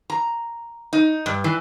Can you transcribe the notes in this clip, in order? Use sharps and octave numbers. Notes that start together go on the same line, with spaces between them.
A#5
D#4
G2
E3